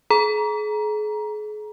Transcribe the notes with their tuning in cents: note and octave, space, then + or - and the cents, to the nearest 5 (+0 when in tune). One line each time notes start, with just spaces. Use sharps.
G#4 +40 A#5 +20